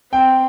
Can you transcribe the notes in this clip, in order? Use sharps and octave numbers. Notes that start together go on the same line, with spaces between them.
C4 G5